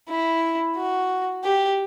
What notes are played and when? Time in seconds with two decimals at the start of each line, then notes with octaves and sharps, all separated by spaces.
0.09 E4
0.76 F#4
1.44 G4